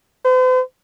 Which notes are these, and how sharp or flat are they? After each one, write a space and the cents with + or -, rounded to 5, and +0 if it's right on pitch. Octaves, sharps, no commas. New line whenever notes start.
C5 -45